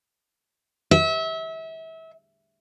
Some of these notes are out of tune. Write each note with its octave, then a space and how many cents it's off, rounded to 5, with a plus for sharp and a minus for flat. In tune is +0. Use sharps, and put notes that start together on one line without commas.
E5 -30